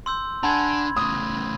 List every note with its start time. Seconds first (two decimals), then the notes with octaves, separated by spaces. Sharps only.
0.06 C6 E6 G6
0.43 D3 D4 F#5 G#5 A5 B5 C6 G#6
0.97 A2 C#3 D#6